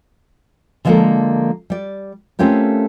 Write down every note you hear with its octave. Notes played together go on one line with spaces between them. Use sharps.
D3 F3 G#3 A#3 A4 A#4
G3 D5
A3 C4 C#4 F4 G4 A#4